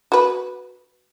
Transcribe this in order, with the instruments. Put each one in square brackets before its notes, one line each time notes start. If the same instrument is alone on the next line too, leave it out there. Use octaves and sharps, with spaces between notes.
[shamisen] F#4 B4